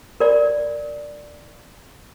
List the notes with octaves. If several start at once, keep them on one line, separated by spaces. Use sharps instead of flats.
A#4 D5